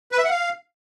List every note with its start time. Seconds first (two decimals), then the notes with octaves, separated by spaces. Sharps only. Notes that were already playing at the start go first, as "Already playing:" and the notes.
0.12 B4
0.18 E5
0.24 F#5
0.30 F5